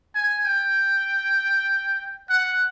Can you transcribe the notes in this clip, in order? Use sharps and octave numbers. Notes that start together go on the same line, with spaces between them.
G#5
G5
F#5